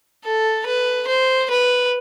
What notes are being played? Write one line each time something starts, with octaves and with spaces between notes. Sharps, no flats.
A4
B4
C5
B4